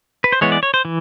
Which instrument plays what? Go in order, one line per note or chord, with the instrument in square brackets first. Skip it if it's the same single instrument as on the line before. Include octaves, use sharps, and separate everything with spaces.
[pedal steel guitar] B4
C5
E3 G#3 B3 C#5
D5
C#5
C5
E3